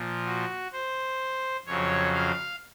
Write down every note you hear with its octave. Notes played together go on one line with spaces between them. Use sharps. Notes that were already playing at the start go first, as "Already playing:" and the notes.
Already playing: A#2 F3
F#4
C5
F2 C#3 F#3 C#5
F5